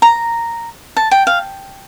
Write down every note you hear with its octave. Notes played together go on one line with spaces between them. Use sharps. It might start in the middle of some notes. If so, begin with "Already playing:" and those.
A#5
A5
G5
F5